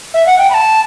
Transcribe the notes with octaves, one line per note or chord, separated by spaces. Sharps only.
E5
F#5
G5
B5
A5